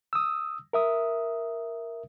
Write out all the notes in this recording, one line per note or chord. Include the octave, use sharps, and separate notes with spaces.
D#6 E6
A#4 E5 D#6